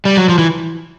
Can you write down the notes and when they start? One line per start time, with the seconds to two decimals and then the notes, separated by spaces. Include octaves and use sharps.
0.05 G3
0.17 F#3
0.29 F3
0.38 E3